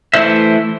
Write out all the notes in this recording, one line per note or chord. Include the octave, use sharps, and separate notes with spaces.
E3 A3 E4 C5 E5